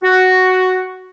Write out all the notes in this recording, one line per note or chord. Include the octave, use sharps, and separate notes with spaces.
F#4